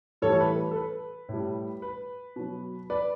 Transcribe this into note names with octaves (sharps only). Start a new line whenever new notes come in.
A2 E3 G3 A4 C#5
A4
B4
A4
B4
A2 G3
B4
B2 F#3
B4 D5